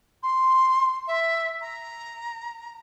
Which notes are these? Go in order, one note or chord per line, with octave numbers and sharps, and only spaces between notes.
C6
E5
A#5